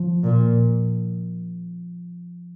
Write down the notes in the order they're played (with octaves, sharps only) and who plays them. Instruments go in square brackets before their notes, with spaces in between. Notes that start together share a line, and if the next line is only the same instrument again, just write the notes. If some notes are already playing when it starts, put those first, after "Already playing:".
Already playing: [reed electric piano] F3
[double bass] A#2